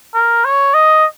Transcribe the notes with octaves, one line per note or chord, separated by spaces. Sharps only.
A#4
C#5
D#5